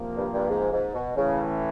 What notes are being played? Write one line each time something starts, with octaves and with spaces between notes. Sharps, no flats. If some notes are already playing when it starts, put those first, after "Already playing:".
Already playing: C3 F3 A#3
G2
G2
G#2
G#2
B2
A2 C#3 E3 A3 C#4